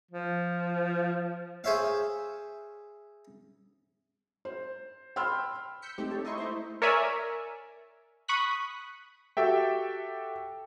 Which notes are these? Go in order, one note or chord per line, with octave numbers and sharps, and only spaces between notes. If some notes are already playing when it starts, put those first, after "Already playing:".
F3
G#4 C5 C#5 E5 F5
C5
G5 B5 C6 E6 F6
E6 G6 B6 C#7
A3 C4 D#4 G4
A4 C#5
D#4 E4 D#5 E5 C6 C#6
A3 E4 C5
A#4 C#5 D5 E5 G#5
B5 C#6 D#6 F#6 B6
F#4 G4 A4 E5 G5